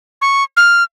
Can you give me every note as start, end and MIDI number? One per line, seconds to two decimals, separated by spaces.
0.22 0.44 85
0.57 0.83 89